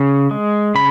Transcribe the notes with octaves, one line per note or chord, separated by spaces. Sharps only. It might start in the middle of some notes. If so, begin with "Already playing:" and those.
Already playing: C#3
G#3
C#3 B5